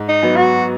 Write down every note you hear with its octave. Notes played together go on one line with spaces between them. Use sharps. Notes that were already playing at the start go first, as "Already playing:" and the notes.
Already playing: G#2
D#4
F#3 B3
F#4